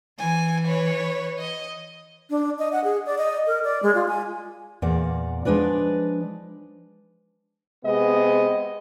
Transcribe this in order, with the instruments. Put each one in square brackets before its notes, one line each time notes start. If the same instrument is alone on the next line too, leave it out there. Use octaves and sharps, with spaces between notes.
[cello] E3 [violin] G#5
[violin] B4 C#5
D#5
[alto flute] D4
D#5
F#5
G#4
D5
D#5
A#4
D5
G#3
F4
G#5
[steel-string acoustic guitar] E2 A#2 A#3 D5 F#5
F3 G#3 D4 B4 D5
[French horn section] C3 G#3 B3 G#4 D#5